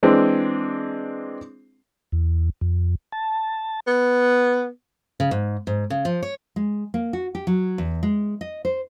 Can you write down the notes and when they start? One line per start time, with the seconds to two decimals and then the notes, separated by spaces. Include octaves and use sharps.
0.03 E3 G#3 C4 D4
2.12 E2
2.61 F2
3.12 A5
3.87 B3
5.20 C#3
5.31 G#2
5.67 G#2
5.90 C#3
6.05 F3
6.23 C#5
6.56 G#3
6.94 A#3
7.13 F#4
7.35 G4
7.47 F#3
7.78 E2
8.03 G#3
8.41 D#5
8.65 C5